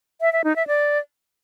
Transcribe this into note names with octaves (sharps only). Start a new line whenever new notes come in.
E5
E5
D#4
E5
D5